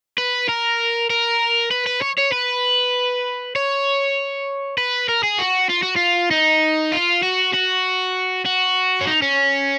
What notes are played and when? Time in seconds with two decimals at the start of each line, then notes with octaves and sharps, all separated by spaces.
0.18 B4
0.49 A#4
1.10 A#4
1.71 B4
1.87 B4
2.02 C#5
2.18 C#5
2.33 B4
3.56 C#5
4.78 B4
5.09 A#4
5.23 G#4
5.39 F#4
5.70 F4
5.83 F#4
5.96 F4
6.31 D#4
6.92 F4
7.23 F#4
7.54 F#4
8.46 F#4
9.01 C#4
9.07 D#4
9.22 C#4